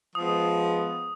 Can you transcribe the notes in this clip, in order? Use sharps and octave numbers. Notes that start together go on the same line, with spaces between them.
F3 G#3 B3 D#6